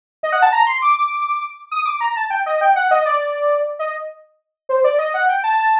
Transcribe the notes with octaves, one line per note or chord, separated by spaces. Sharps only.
D#5
F#5
A5
A#5
C6
D6
D#6
D6
A#5
A5
G5
D#5
G5
F#5
D#5
D5
D#5
C5
D5
D#5
F#5
G5
A5